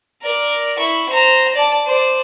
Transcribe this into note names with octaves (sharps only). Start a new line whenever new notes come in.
A#4 D5
E4 C#6
C5 A#5
D5 A5
C5 D5